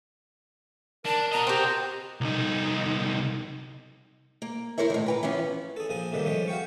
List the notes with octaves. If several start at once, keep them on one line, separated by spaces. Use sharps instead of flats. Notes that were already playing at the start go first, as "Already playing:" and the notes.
D4 A#4 A5
F#4 D#5 A#5
C4 G4
C2 D#4
A#3
E4 A#4 C5 C#5 E5
A2 D#3 E3
B4 G5 A#5
E3 F3 B3 C#4
G#4 A4
A#1 F3 G#4 G#5
A2 C3 D#3 E3 G3 A#3
F3 G#3 A3 C#4
F#4 F5 G5 C#6